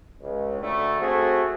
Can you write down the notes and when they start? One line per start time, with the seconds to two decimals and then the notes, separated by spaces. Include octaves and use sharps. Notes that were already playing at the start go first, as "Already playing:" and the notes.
0.21 C#2
0.61 D2 D3 A3
0.99 A3 C4 F#4 G#4